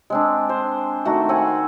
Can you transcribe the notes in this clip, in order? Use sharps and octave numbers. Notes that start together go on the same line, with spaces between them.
G#3 C4 D4
C5
D#3 A3 F#4
C4 F#5 G#5